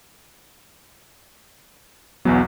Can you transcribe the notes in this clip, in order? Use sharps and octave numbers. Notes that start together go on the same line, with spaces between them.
B1 E2 F#3 B3